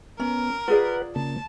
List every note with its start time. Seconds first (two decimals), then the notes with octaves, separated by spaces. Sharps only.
0.20 B3 C#4 A#4
0.68 F4 G#4 B4 D5 F#5
1.16 C#3 A#3 A5